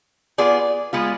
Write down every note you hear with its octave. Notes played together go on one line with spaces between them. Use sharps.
B3 F4 G#4 D5
G#3 B3 F4